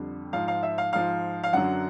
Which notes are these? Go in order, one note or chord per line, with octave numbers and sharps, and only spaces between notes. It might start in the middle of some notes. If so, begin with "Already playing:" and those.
Already playing: F2 D3 G3
G#2 F3 F5
F5
E5
F5
G#2 F3 F5
F5
F#2 D3 F#3 F#5